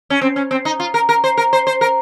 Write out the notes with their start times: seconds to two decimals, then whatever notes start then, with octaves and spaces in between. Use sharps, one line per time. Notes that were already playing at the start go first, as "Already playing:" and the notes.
0.10 C#4
0.22 C4
0.36 C#4
0.51 C4
0.65 D#4
0.80 F4
0.94 A#4
1.09 A#4
1.24 C5
1.38 A#4
1.53 C5
1.67 C5
1.81 A#4